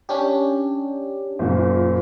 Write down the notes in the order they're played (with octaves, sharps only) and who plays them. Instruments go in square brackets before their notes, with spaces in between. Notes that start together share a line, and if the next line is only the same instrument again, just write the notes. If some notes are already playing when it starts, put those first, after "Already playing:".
[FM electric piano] C#4 D4 G4
[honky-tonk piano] F#1 A#2